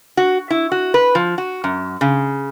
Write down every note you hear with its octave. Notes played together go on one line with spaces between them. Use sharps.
F#4
E4
F#4
B4
F3
F#4
F#2
C#3